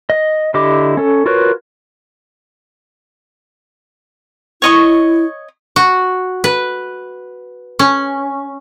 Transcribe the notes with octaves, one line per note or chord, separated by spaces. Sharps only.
D#5
D3 E4 G4 D#5 D6
C#4 A4
F4 F#4 A#4 B4 C#5
E4 C#5 D#5 C#6
F#4
B4
C#4